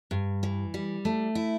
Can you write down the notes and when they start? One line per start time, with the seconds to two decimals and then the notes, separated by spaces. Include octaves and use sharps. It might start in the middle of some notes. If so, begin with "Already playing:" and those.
0.11 G2
0.43 E3
0.74 G3
1.05 A3
1.35 E4